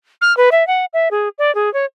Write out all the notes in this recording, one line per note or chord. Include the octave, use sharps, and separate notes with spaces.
F6
B4
E5
F#5
E5
G#4
D5
G#4
C#5